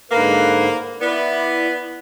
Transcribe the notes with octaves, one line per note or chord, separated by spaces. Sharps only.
G#2 D3 A#3 B4
B3 E4 D5